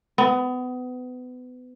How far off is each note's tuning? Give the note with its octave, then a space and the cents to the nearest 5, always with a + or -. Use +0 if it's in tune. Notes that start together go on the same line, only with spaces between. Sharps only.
B3 +30